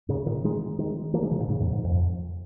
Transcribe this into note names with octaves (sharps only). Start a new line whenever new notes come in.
G#2 C#3
A#2 D#3
D#3 G#3
D#3 G#3
F3 A#3
D#3 G#3
C#3 F3
A#2 D#3
G#2 C#3
F2 A#2
G#2
F2